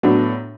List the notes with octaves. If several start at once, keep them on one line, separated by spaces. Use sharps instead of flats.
A2 F#3 B3 D4